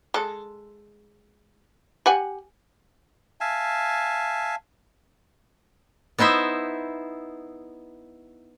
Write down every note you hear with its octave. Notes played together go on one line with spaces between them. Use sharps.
G#3 A4
G4 F#5 G#5
E5 F5 G#5 A5
B3 D#4 E4 C5 E5